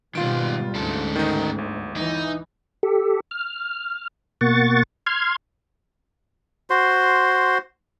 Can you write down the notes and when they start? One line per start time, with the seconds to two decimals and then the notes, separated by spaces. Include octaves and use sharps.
0.15 G#2 B2 D#3 G3 G#3 F4 D7
0.75 D2 G#2 C#4 A4
1.16 D#3 D#4
1.58 G1
1.96 E3 D#4
2.83 G4 A4
3.31 F6
4.41 B2 A#3 F#5 C#6 A6
5.07 C6 F6 G#6
6.70 F#4 C5 C6